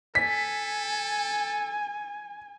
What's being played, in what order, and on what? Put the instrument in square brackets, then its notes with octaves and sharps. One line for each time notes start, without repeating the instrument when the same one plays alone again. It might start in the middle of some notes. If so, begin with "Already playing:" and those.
[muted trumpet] A4 [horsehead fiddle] G#5 [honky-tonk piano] B6